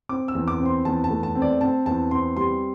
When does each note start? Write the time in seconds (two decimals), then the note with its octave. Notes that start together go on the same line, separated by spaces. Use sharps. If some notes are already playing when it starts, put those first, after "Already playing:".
0.09 C4 D6
0.28 E6
0.35 E2
0.48 D6
0.60 C4
0.66 C6
0.85 E2 A5
1.04 A5
1.10 A3
1.23 A5
1.35 C4
1.42 D5
1.61 C4 A5
1.86 E2 A5
2.11 C4 C6
2.37 G3 C6